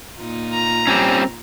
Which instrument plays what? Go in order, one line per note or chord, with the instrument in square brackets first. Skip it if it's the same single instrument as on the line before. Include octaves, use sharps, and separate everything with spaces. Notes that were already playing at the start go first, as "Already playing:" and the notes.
[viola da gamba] A#2 D#4 F4
[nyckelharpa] A#5
[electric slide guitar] G3 C4 C#4